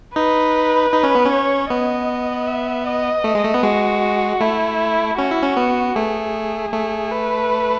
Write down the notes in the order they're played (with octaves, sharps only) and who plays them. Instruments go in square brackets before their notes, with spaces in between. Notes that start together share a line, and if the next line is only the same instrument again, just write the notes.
[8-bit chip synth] D#4 [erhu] B4
[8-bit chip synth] D#4
C#4
B3
C#4
[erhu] C#5
[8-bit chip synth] B3 [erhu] D#5
[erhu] E5
D#5
[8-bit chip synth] A3
G#3
A3
B3
[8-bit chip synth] G#3 [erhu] F#4
[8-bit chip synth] A3 [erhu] E4
[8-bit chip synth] C#4 [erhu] F#4
[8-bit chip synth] E4
C#4
B3
[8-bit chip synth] A3 [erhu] G#4
[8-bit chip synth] A3
[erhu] B4